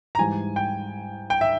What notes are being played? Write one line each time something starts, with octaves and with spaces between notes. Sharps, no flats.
A#5
G#2 E3 G3 G#5
G5
G5
E5